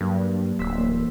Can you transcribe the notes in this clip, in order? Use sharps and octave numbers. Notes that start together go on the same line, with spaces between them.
G2 F#3 A#3 D4
D1 C6 E6 B6
E3 A#3